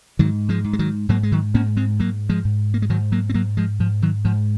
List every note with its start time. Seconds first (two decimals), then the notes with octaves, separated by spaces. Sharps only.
0.19 G#2 D#3 F#3
0.49 F3 G#3
0.64 G#2
0.73 G#3
0.79 D#3 F#3
1.09 G#2 F#3 A#3
1.23 G#3
1.32 D#3 F#3
1.54 G#2 A#3 C#4
1.77 G#3 C4
1.99 G#2 F#3 A#3
2.29 F3 G#3
2.45 G#2
2.74 A#3
2.82 G#3
2.89 G#2 D#3 F#3
3.12 F#3 A#3
3.29 C4
3.34 G#2 F#3 A#3
3.57 F3 G#3
3.79 G#2 F3
4.02 D#3 F#3
4.25 G#2 F3